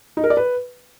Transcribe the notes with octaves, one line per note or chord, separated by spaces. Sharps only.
D#4
A#4
D5
B4